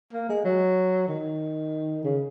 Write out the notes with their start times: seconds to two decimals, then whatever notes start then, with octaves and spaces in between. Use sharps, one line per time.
0.13 A#3
0.29 G#3
0.45 F#3
1.08 D#3
2.04 C#3